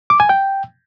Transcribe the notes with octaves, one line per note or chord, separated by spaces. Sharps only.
D6
G#5
G5